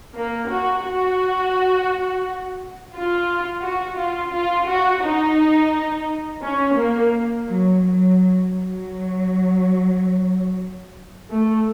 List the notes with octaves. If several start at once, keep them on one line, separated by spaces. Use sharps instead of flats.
A#3
F#4
F#4
F4
F#4
F4
F4
F#4
D#4
C#4
A#3
F#3
F#3
F#3
A3